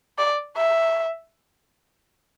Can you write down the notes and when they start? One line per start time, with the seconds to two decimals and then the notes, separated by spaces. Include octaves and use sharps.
0.18 D5
0.57 E5